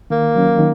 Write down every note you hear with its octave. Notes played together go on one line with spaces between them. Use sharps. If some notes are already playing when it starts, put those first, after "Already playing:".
D#3 A#3
F#3 C#4
D#3